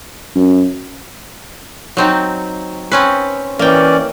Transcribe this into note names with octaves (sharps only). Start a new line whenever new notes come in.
F#2
F#3 C4 D#4
C4 C#4 B4
E3 A#3 C#4 D5 G5